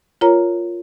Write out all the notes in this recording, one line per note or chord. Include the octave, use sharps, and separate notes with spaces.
F4 A#4 C#5 A#5